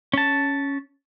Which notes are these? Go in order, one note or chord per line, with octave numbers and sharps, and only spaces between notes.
C#4 A5